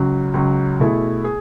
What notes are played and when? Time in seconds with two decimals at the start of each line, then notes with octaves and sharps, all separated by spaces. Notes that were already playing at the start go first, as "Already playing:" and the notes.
Already playing: C#2 C#3 F#3
0.34 C#2 C#3 F#3
0.80 B2 A3 E4 G#4
1.24 G#4